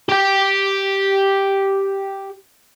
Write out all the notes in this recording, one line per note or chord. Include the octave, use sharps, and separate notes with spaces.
G4 G5